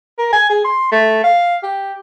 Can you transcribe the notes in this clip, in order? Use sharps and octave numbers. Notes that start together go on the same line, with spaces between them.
A#4
G#5
G#4
C6
A3
F5
G4